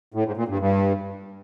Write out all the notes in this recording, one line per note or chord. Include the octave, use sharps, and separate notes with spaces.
A2
G#2
A#2
G2
G2